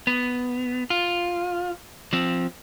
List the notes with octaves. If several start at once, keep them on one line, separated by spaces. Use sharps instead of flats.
B3
F4
F3 C4